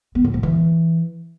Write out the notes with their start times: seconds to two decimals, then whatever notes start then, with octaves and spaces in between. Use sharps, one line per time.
0.15 B3
0.24 A2
0.34 F3
0.43 E3